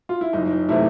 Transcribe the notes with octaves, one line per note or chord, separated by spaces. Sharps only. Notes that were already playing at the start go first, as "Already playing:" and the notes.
F4
E4
F#1 D#4
C3 E3 A3 E4